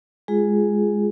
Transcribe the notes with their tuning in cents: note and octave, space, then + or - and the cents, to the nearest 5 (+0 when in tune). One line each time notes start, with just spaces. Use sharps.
G#3 +0 F4 +0 G#4 +0